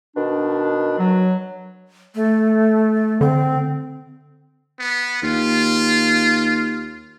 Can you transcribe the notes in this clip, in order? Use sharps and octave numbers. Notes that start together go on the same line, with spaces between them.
B2 D#3 D4
F#3
A3
D3 C4
B3
D#2 F4